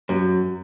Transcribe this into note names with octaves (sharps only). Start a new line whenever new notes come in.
F#2